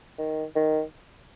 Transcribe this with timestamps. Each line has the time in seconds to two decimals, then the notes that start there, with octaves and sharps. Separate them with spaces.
0.18 D#3
0.56 D#3